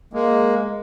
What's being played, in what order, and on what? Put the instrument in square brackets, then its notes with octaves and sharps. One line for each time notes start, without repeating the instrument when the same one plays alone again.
[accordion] G#3 A#3